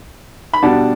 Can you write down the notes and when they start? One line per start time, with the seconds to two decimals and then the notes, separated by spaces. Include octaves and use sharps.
0.53 B5
0.63 B2 G3 D4 F#5 A5